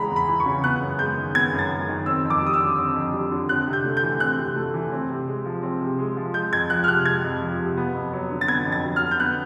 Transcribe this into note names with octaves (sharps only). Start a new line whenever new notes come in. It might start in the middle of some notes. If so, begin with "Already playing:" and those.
Already playing: E2 C#3 E3 G#3 A#5 B5
E2
B5
E3
C#6
C#3
B3 F#6
F#2
G#3 G6
D#3
B3 G#6
F#2
A6
G#3
D#3
C4 E6
F2
D6
G3 D#6
E6
D3
C4
F2
G3
D3
C4 F#6
C3
G6
A3
G6
E3
C4 F#6
C3
A3
E3
C4
C3
G#3
F3
C4
C3
G#3
F3
G#3 G6
F2 G#6
F3 F#6
F6
C3 F#6
G#3 G#6
F2
F3
C3
B3
F2
F#3
D3
A6
B3 G#6
F2
A6
F#3
F6
D3
G6
B3 F#6